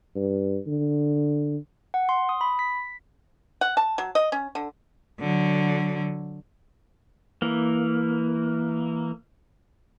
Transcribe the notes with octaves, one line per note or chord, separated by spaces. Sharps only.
G2
D3
F#5
C6
D#6
B5
B6
F#5
A5
F#3
D#5
C#4
D3
D3 F#3
E3 A#3